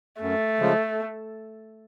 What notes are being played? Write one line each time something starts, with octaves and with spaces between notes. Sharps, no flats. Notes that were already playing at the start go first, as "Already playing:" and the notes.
F#2 A3
C#3 F3 G#3